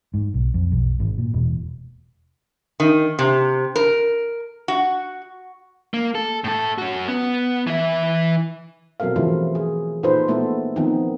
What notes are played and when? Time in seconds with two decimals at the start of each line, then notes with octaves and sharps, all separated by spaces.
0.14 G#2
0.34 B1
0.54 F2
0.72 B1
1.00 G#1
1.18 A#2
1.34 E1
2.80 D#3
3.19 C3
3.76 A#4
4.68 F#4
5.94 A#3
6.15 A4
6.44 A2 A4
6.78 C#4 F#4
7.08 B3
7.67 E3 E5
9.00 B2 F#3 C4 A4 A#4 F5
9.16 C#3 E3 F3 A3 E4 F4
9.55 G#4
10.03 A#2 D#4 F4 A4 B4 C5
10.28 A#2 A3 B3 E4 A4
10.76 D#3 F3 B3 C4 D#4